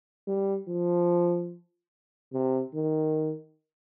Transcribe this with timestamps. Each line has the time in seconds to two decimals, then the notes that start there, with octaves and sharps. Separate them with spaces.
0.27 G3
0.68 F3
2.33 C3
2.74 D#3